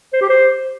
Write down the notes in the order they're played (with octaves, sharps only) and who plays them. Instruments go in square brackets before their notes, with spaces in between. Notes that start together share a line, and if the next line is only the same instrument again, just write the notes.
[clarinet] C5
G4
C5